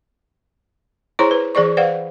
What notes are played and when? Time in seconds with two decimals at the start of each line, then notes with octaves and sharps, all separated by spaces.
1.19 E4 G#4 C5 C#5 A#5 C6
1.31 B4
1.55 E3 G#4 C5 D5 C#6
1.77 B4 C5 D5 F5 F#5